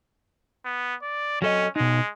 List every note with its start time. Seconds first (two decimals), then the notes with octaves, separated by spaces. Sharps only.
0.65 B3
1.02 D5
1.42 F#3 C#4 A4 D#5
1.76 B2 G#3 D#4